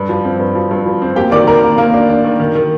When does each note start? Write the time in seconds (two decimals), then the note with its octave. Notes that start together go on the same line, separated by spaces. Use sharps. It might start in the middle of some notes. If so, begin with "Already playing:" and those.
Already playing: G2
0.09 F3
0.25 C4
0.39 G2
0.55 F3
0.71 G2
0.86 F3
1.02 C4
1.16 A#3 G4 G5
1.32 D#3 D5 D6
1.47 D#3 A#4 A#5
1.63 A#3
1.78 D#3 A#3 A#4
1.94 D4
2.09 D4
2.24 D#3
2.40 D#3
2.55 D#3